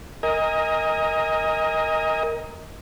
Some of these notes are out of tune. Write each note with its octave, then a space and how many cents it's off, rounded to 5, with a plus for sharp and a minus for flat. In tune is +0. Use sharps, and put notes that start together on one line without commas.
A#4 +0 D#5 +20 G#5 -35